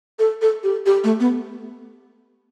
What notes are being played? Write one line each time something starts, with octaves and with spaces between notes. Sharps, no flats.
A4
A4
G4
G4
A3
B3